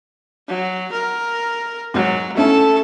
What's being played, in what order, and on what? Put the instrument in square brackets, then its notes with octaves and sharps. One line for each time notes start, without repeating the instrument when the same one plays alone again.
[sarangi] F#3
A#4
[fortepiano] G#2 [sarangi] F#3
[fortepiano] A3 C#4 E4 [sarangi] A4